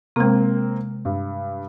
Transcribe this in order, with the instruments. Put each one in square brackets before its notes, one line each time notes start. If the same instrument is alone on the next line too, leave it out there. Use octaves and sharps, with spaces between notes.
[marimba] C3 G#3 [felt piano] A#3 C4
[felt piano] G2